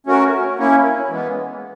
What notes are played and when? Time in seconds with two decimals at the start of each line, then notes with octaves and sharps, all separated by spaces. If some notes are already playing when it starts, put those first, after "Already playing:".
0.07 A3 C#4 F#4 A#4
0.58 A#3 C#4 E4
1.09 E3 G#3 B3